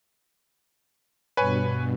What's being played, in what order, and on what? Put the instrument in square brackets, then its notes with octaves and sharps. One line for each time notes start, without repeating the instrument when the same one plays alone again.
[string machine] G2 B2 [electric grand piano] B4 C#5 G#5